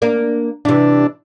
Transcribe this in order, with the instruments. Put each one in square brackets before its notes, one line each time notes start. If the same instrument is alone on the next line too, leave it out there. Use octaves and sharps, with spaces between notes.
[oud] A#3 D4 A#4
[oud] C3 E3 [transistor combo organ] D4